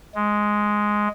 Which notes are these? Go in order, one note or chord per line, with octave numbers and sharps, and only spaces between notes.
G#3